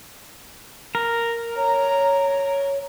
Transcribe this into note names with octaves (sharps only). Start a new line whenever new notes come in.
A#4
C#5 A#5